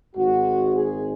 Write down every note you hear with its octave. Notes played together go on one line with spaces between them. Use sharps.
G#1 G#2 G#3 F#4
G#4